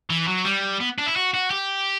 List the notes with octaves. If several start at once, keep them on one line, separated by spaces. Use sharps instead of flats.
E3
F#3
G3
B3
D4
E4
F#4
F#4
G4